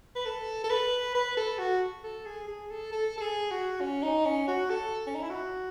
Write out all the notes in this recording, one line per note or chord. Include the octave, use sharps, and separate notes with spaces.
B4
A4
A4
B4
B4
A4
F#4
A4
G#4
G#4
A4
A4
A4
G#4
F#4
C#4
D#4
C#4
F#4
A4
C#4
D#4
E4
F#4